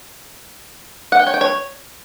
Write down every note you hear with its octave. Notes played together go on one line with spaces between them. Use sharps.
F#5
G5
C#5
G5
C#5